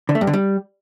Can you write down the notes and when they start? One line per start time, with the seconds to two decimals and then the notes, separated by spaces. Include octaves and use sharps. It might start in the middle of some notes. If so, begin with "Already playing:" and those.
0.09 D3
0.15 A3
0.21 G2
0.27 D3
0.34 G3